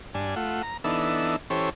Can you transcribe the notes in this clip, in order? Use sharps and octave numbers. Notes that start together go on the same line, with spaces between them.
G2 D4 G#5
A3 F4 F#5
A#5
E3 B3 D4 D#4 A4 E5
E3 C#4 G4 A4 C5 C#5